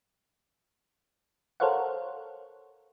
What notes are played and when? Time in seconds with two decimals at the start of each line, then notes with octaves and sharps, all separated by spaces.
1.60 A4 A#4 C5 C#5 F5 F#5